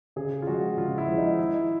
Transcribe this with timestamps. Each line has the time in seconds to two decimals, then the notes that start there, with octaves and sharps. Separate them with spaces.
0.16 C#3 G#4
0.42 F4
0.47 F3 G#3 F#4
0.77 C#3 F4
0.98 E4
1.07 F3 G#3
1.18 D#4
1.39 D#3 E4